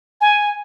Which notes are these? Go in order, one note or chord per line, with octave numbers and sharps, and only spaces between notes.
G#5